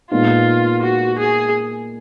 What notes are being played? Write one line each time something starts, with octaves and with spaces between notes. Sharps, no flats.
A#2 G#3 B3 D#4 F4
F#4
G#4